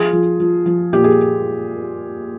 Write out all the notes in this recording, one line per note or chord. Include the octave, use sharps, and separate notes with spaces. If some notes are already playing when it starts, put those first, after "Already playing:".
Already playing: F3 F4 G#4
F3
F3
F3
A#2 G4
G#4